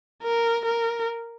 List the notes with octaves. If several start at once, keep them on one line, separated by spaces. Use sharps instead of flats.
A#4
A#4